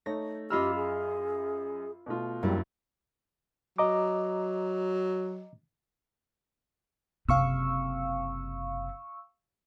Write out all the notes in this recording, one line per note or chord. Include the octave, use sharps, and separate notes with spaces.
A3 D#4 C#5 A#6
F#2 F4 G4 D#5 B5 E6 F6
G#4
B2 A3 F4
D#1 A#1 F#2 G3 E4 A#4
F#3 D#5 A#5 D6
F#1 C3 F5 C#6 E6